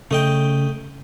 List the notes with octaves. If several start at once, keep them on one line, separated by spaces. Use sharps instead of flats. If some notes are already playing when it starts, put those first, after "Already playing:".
C#3 A3 D#5 G5